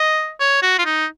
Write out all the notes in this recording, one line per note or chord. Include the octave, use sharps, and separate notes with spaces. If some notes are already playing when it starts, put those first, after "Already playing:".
Already playing: D#5
C#5
F#4
F4
D#4